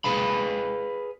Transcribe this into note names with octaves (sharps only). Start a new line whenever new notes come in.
G#4 B4 F5 B5